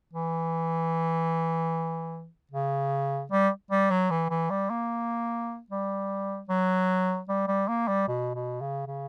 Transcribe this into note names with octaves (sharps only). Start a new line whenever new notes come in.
E3
C#3
G3
G3
F#3
E3
E3
G3
A#3
G3
F#3
G3
G3
A#3
G3
B2
B2
C#3
C#3